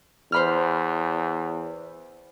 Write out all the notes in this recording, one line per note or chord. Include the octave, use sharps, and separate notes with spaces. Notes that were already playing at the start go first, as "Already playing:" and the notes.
E2 C5 B5 F6